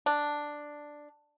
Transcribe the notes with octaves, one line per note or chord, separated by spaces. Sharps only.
D4